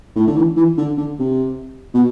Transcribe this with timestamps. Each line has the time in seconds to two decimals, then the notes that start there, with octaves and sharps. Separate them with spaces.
0.16 A2
0.27 D3
0.36 E3
0.57 E3
0.78 D3
0.98 D3
1.19 C3
1.94 B2